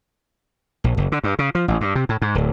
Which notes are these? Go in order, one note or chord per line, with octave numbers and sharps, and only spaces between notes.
A#1
F#1
D3
G2
C#3
F3
A1
G2
C3
A2
G#2
D1